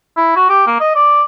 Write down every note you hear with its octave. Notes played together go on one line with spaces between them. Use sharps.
E4
F#4
G4
A#3
D#5
D5